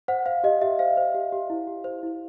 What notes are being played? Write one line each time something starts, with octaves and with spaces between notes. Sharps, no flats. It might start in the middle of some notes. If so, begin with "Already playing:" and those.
C5 F#5
C5 F5
G4 D#5
G4 E5
C5 F5
C5
G4
G4
E4
G4
C5
E4